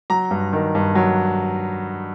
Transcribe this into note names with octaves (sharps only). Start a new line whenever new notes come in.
F#3 A#5
G2
D#3
G2
F#3